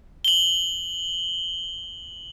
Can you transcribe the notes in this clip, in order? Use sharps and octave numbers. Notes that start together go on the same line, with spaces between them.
F#7 G7